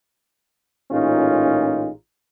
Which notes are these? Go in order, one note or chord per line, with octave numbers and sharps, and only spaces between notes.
A1 A#2 C#4 D#4 F4 G#4